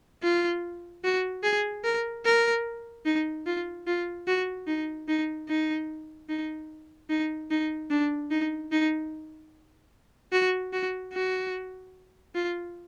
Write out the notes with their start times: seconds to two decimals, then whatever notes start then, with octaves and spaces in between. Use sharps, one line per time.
0.23 F4
1.04 F#4
1.44 G#4
1.84 A#4
2.25 A#4
3.05 D#4
3.46 F4
3.87 F4
4.27 F#4
4.67 D#4
5.08 D#4
5.48 D#4
6.29 D#4
7.10 D#4
7.51 D#4
7.90 D4
8.31 D#4
8.72 D#4
10.32 F#4
10.73 F#4
11.13 F#4
12.35 F4